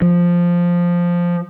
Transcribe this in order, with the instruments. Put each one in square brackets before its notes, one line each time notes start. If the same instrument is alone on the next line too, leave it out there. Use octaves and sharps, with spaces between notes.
[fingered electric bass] F3